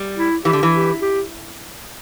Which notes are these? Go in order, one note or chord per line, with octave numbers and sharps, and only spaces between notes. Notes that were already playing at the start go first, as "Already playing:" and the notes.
Already playing: G3
E4
E3 G4
D3
E3
G4
G4